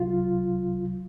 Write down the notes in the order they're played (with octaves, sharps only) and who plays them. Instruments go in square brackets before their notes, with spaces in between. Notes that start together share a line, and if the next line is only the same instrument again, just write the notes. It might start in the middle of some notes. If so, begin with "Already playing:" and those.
Already playing: [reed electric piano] C2 C3 F#3 F4